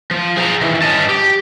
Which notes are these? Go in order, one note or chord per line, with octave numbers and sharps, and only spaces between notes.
F3
G#4 C5 F5 A#5
D#3 E3
G2 C#4 D#5 A5
G4